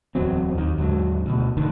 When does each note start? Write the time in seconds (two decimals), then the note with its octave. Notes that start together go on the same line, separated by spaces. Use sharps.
0.15 D1 E2 F#3 C4
0.53 D#2 D#3
0.78 D#2 G#2 D3 F#3
1.26 D2 B2
1.57 A1 D3 D#3